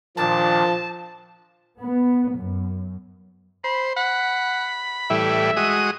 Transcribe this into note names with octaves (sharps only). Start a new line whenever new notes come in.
A#2 D#3 F3 D4 A5
B3
F#2
C5 B5
F#5 B5
A2 E3 G3 E5
G#3 F#4 D#6